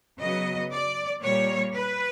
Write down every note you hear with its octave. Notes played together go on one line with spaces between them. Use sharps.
C#3 F#3 B3 D#5
D5
A#2 G3 A#3 C#5
B4